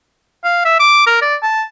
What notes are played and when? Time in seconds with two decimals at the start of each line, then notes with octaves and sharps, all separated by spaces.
0.44 F5
0.65 E5
0.80 D6
1.07 A#4
1.22 D5
1.43 A5